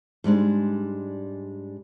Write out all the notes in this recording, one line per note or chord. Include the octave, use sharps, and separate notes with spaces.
G#2 G3 G#3 D4